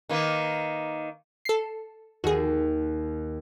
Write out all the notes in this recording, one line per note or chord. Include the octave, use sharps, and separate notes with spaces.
D#3 A#3 B4
A4 C7
D#2 F#4 G#4